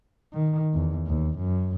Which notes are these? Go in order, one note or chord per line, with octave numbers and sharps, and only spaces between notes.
D#3
E2
D#2
F#2